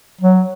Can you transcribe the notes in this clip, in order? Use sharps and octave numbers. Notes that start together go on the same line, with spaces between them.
F#3